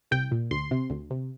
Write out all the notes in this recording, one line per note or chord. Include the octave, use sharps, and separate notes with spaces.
C2 G5
A#2
D2 C6
C3
D2
C3